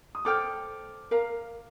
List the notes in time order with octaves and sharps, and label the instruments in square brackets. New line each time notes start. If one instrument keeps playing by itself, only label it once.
[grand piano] D#6
[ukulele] A4 C5 G5 [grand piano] D6 F6
[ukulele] A#4 F5 A#5